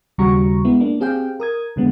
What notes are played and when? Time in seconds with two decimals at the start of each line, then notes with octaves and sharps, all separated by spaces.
0.18 D#2 C#3 G3 F#4 A#5 C#6
0.65 G#3 B3 E4
0.80 A#3 D4
1.00 C4 G4 G#4 F5 G5
1.40 A#4 D#6 G#6
1.76 F2 D3 G#3 B3